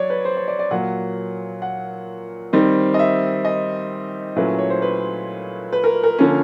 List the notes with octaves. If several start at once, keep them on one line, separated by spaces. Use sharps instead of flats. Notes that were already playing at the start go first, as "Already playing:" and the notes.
Already playing: F#3 C#5 D5
B4
C5
C#5
D5
D5
A#2 F#3 A#3 F#5
F#5
D#3 G3 C4 D#4
D#5
E5
D#5
A#2 F#3 A3 C#4 E4 B4
C#5
C5
B4
B4
A#4
A#4
D3 F3 A#3 C#4